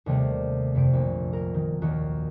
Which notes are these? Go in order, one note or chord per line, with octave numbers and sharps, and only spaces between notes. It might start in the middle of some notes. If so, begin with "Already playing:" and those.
D#2 C3 G3 A3
F2 C3 D7
A#1
A#4
D#3
D#2 D#3 F#4